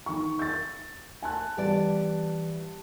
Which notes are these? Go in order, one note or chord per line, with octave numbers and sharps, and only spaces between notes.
D#3 C#6
G6 A6
G#5 A5 F#6
E3 G3 B3 D5 A5